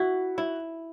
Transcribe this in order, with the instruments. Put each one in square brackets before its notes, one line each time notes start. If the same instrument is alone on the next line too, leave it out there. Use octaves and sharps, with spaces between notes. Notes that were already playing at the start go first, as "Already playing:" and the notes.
Already playing: [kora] E4 [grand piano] F#4
[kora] E4